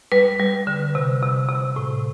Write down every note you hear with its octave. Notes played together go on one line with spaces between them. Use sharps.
G3 B4
G3
D3
C3
C3
C3
A2